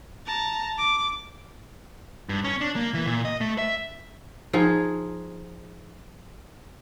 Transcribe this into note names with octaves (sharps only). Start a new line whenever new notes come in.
A5 A#5
D6
G2
C#4
D4
A#3
E3
A#2
D#5
A3
E5
F3 D#4 G#4